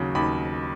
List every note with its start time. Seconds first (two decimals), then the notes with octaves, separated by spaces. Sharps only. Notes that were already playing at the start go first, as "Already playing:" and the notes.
Already playing: D#2 C#3 F#3
0.15 D#2 B5